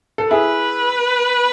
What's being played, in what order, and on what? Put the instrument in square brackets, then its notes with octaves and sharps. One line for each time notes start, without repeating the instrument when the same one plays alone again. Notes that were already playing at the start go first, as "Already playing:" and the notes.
[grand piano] A4
[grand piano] E4 G#4 [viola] B4